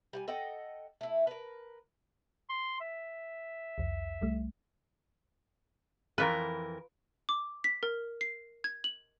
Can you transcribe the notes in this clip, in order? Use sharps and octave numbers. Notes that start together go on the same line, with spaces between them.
G3 F#5 G#5
A4 D#5 F#5 G5
A3 E4
A#4 B4
C6
E5
C2 F2
C2 G3 A3
F2 E3 F4 A#4 B4
D6
B6
A#4
C7
G#6
F#7